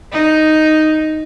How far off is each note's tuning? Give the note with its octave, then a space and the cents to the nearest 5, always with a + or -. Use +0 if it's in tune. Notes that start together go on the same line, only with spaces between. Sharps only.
D#4 +0